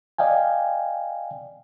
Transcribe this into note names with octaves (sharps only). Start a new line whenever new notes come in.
D5 D#5 F5 G5 G#5